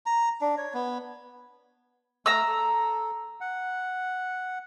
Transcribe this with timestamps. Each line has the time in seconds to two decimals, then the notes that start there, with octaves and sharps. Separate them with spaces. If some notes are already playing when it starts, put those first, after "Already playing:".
0.06 A#5
0.41 D4
0.58 C#5
0.74 B3
2.26 A3 A#5 E6 F6
2.47 A4
3.41 F#5